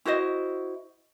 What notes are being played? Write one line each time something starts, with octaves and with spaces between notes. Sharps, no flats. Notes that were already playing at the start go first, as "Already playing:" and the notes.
E4 F#4 C5 D#5